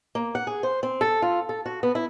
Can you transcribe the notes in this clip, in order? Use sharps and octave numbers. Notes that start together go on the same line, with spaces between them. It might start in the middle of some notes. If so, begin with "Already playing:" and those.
A#3
F#5
G#4
C5
C4
A4
F4
A4
F#4
B3
E4